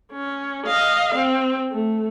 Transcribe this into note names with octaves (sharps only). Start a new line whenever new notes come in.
C#4
D#5 F5
C4
A3